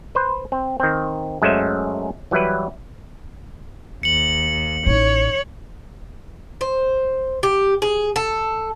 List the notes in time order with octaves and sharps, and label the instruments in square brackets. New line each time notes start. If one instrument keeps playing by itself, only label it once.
[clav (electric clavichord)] B4 C5
C4
D#3 C4
F#2 G#3 A3 C#4 C5 E5
E3 F#3 G3 E4 B4
[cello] D#2 [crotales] C#7 F#7
[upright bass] A1 D#4 [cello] C#5
[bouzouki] C5
G4
G#4
A4